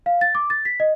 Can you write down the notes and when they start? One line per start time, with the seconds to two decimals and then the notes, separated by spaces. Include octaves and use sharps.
0.06 F5
0.21 A6
0.35 D6
0.50 A6
0.65 B6
0.80 D#5